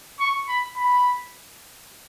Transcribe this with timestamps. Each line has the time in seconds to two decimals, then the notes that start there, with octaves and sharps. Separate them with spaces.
0.20 C#6
0.48 B5
0.76 B5